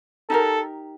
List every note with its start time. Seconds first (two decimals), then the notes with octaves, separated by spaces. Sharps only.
0.30 D#4 G4 A4 A#4